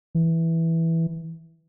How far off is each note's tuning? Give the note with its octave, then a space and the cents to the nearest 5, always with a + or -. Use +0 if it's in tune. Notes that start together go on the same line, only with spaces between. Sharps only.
E3 -5